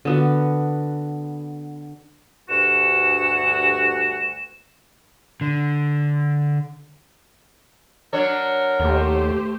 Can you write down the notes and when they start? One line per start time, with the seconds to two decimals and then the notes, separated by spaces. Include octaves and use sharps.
0.05 D3 B3 F#4
2.49 D2 G2 F#4 E7
5.41 D3
8.13 F#3 D4 A#4 C#5
8.80 D#2 A3 G4 C5